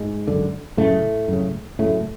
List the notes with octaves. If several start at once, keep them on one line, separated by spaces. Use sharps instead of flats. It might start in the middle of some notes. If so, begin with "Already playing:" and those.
Already playing: G#2 G#3
F#2 D3
F#2 A2 C#3 A3
F#2 C#3
F#2 A2 C#3 A3